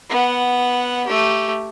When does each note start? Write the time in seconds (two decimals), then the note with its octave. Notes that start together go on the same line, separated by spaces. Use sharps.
0.10 B3 F#5
1.07 A3 G4